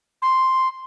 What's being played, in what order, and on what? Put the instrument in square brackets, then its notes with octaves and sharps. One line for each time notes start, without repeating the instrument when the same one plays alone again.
[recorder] C6